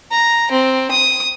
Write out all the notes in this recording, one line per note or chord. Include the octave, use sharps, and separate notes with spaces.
A#5
C4
D#6